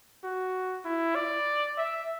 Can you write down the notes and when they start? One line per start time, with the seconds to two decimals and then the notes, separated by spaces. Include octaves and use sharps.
0.24 F#4
0.85 E4
1.15 D5
1.78 E5